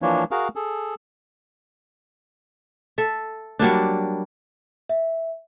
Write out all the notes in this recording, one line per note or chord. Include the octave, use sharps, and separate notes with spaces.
E3 F3 A#3 D4 C#5
F#4 G#4 A#4 F5
G#4 A4
A4 E5
F#3 G3 A#3 D4
E5